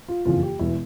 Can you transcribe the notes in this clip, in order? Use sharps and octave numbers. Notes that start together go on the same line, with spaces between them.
F4
F#1 F2 C#3 E3 F4
G4
E1 E2 B2 E4